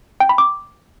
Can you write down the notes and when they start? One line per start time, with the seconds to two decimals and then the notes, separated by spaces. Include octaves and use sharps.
0.20 G5
0.29 B5
0.38 D6